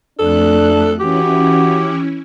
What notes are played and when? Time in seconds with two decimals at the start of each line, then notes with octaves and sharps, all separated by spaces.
0.19 F2 A3 D4 A4 F#6
1.00 E3 C#4 E4 F#4 G4